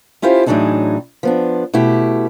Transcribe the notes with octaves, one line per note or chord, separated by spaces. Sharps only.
C#4 E4 F4 G4 C5
A2 E3 F#3 D4 D#4 G#4
F3 B3 D4
B2 A3 E4 G4